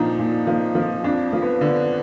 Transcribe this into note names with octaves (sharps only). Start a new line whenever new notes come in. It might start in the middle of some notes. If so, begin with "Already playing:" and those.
Already playing: A#2 F3 D4 D#4
A#2
F3
F3
F2 D4
F3
B3
D3